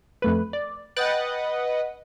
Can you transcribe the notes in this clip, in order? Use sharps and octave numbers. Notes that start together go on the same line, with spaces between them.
F2 A3 B4
D5
B4 D#5 F#5 G5 F#6 A6